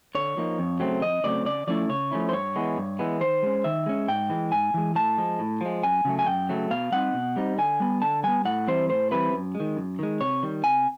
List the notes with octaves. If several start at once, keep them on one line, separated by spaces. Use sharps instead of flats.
D3 C#5
F3 A#3 D#4
F2
C#3 F#3 A3 C4
F2 D#5
C#3 F#3 A3 C4 D5
C#3 D5
F3 A3 C#4 E4 D5
C#3 C#5
F3 A3 C#4 E4
C5
G2 C#5
E3 G#3 B3
G2
E3 G#3 B3
D#3 C5
G#3 C#4
D#3 E5
G#3 C#4
G#2 G5
E3 G#3
G#2 G#5
E3 G#3
A2 A5
F3 G#3
A2
F3 G#3
F#2 G#5
C#3 F#3 A3
G#5
F#2 G5
C#3 F#3 A3
B2 F5
G3 C4 D#4 F#5
B2
G3 C4 D#4
D3 G#5
G3 B3
D3 A5
G3 B3 G#5
A2 F#5
E3 G3 C4 E4 C5
A2 C5
E3 G3 C4 E4 B4
F#2
G#3
D#3
F#2
D#3 G#3
C3 C#5
D#3 G3
C3 G#5